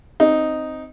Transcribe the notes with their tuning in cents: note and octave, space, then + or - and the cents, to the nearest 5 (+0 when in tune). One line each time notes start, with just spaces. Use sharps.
C4 +0 D#4 +0